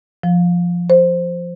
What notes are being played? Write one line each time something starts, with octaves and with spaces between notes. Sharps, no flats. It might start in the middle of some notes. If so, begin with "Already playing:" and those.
F3
C5